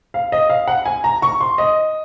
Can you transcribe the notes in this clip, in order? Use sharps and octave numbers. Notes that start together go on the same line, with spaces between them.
F5
D#5
F5
F#5
G#5
A#5
C#6
C6
D#5